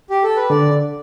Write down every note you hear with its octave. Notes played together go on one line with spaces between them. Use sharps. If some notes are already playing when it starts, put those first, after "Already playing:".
G4
A4
B4
D3 D5